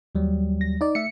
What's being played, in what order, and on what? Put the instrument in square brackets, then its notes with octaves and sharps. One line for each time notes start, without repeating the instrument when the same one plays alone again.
[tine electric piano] D#2 F#3 G3
[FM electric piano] A#6
D#4 D5
[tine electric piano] A3 E5 [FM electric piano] C#7